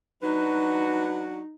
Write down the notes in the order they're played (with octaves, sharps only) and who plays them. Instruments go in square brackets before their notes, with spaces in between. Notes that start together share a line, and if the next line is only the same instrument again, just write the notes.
[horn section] F#3 D4 F#4 [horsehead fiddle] D#4 [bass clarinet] B4